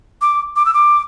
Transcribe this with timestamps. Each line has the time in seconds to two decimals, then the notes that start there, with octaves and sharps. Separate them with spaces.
0.21 D6
0.56 D6
0.66 E6
0.74 D6